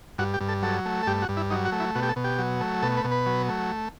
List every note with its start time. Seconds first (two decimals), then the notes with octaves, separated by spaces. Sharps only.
0.18 G2 F#4
0.34 G4
0.40 G2
0.49 A4
0.62 F#3 A4
0.85 A3
1.03 A4
1.07 G2 G4
1.22 F#4
1.29 G2
1.37 E4
1.50 F#3 D#4
1.65 F#4
1.72 A3
1.80 E4
1.95 B2 F#4
2.03 G4
2.09 A4
2.16 B2
2.24 G4
2.39 F#3
2.61 A3
2.82 B2 A4
2.97 B4
3.04 B2
3.11 B4
3.26 F#3
3.48 A3